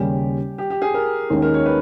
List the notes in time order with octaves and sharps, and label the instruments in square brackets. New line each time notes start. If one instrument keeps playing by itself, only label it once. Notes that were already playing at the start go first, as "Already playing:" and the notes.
Already playing: [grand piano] D#2 C#3 G3 C#4 [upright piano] G4
[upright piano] G4
G4
G#4
A#4
[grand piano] D#2 D#3 G#3 C#4
[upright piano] A#4
C#5
B4